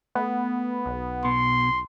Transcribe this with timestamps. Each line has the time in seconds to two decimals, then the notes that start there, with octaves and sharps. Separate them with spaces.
0.15 A3 B3
0.86 B1
1.25 B2 C6